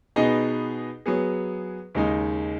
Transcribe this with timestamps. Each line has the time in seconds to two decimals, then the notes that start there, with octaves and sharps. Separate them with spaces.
0.16 B2 B3 D#4 G#4 D#5
1.06 F#3 B3 G#4
1.95 D#2 C#3 G#3 D#4